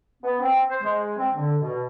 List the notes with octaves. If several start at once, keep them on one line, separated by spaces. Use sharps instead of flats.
B3
C4
C5
G#3
C4
D3
B2